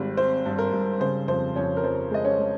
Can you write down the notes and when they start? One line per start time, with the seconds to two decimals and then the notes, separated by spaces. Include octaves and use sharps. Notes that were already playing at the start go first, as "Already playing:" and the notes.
Already playing: G#1 G3 C4
0.17 C4 C5
0.46 G2
0.58 A#4
0.73 G2
1.00 C#3 C5
1.28 F2 C5
1.56 F2 C#4 C#5
1.77 A#4
1.83 F2 C5
2.11 G#3 D#5
2.25 C#4 C#5
2.39 G#3